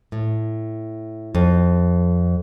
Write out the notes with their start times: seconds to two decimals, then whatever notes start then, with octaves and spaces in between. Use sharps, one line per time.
0.12 A2
1.35 F2